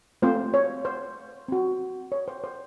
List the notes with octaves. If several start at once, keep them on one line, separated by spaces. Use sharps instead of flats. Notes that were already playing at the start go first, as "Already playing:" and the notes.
A3 C4 F4 C5
C#5
C5
C4 F#4
C#5
C5
C5